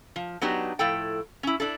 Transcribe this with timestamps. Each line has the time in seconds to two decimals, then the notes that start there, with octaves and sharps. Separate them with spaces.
0.16 F3
0.42 F#3 B3 D4 D#4 G4
0.79 A2 F3 E4 A4 G5
1.43 C#4 E4
1.60 D4 E4 A4